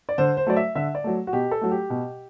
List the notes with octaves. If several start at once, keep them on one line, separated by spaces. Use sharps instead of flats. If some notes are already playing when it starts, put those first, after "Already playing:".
D5
D3 C5
C5
F#3 A3 D5
E5
D3 E5
D5
F#3 A3
F#4
B2 G4
A4
F#3 A3
G4
B2